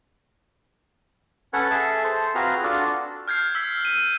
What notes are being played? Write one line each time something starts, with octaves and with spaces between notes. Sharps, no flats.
C#4 A4 B4 C#5 F#5
G#4 A4 E5
A4 C5
C4 F4 F#4 G#4 B4 A#5
D4 F4 F#4 A4
F6 G6 G#6 C7
E6 B6
E6 D#7